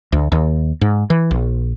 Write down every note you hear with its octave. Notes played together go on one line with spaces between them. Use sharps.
D2
D#2
G#2
E3
A#1